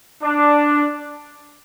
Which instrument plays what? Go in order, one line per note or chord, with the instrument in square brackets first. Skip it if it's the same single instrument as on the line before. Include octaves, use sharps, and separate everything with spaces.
[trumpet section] D4